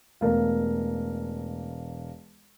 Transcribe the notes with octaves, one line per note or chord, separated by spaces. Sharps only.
E1 E2 A3 A#4 F5